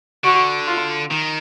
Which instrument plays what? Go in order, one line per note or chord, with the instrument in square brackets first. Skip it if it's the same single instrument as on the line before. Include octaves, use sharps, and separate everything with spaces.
[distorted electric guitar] D3 [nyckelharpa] F#4
[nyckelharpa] F4
[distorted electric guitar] D#3